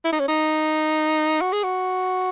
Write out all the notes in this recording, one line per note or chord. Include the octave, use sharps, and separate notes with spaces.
E4
D#4
C#4
D#4
F#4
G#4
F#4